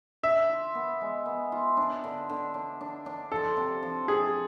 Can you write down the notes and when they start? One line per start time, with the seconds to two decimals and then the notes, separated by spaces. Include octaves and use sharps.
0.23 D3 E5
0.49 F4
0.75 B3
1.01 G#3
1.26 B3
1.52 F4
1.77 D4
2.04 D3
2.29 D3
2.54 D4
2.81 D4
3.06 D4
3.32 F3 A4
3.57 C3
3.83 F3
4.08 C3 G#4